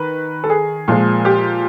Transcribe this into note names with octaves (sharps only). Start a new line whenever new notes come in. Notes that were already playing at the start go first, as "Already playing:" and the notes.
Already playing: D#3 B4
A4
G#4
A#2 F3 G#3
G4